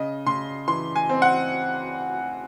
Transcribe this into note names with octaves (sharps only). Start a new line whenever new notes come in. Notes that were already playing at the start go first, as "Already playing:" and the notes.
Already playing: C#3 D#5
C#3 C6
E3 C6
G#5
C4
F#5